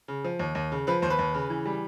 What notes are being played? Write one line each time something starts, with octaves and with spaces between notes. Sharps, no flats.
C#3
F3
D#2
D#2
C#3
F3 B4
D#2 C5
B4
D#2
C#3
E3
G3